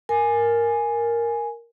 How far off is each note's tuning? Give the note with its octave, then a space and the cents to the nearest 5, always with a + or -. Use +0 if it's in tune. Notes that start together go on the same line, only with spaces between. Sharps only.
A#4 +0 G#5 +0